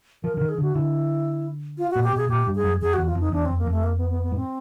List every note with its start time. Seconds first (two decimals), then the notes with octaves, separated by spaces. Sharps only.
0.23 F3 A#4
0.36 D3 A#4
0.41 D#3
0.49 G#4
0.58 D3 F#4
0.74 D3 E4
1.78 F4
1.91 F#4
1.96 A#2
2.04 G4
2.12 B2 G#4
2.29 A#2 G4
2.47 G2
2.55 G#4
2.64 F#2
2.81 F2 G#4
2.93 F#4
2.98 E2
3.06 F4
3.15 F2 D#4
3.32 E2 D4
3.45 C4
3.50 F2
3.58 A#3
3.67 F2 A3
3.83 A#3
3.97 B3
4.09 B3
4.23 B3
4.32 G#2
4.36 C4